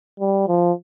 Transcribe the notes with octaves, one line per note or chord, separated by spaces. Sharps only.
G3
F3